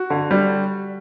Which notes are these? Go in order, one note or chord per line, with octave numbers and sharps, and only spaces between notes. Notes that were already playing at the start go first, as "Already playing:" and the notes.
Already playing: F#4
D3
G3